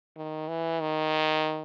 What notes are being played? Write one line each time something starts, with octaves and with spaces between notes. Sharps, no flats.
D#3
E3
D#3